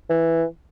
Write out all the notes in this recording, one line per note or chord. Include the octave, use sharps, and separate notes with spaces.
E3